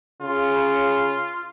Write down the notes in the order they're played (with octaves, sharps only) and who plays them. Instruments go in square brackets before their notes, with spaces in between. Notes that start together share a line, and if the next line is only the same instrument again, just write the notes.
[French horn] C#3 [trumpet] F4